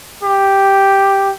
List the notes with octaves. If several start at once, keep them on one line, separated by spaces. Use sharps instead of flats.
G4